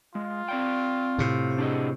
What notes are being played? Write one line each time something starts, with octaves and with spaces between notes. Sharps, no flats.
G#3 F4
C4 D5 G5
A2 C3
D4 G#4 D#5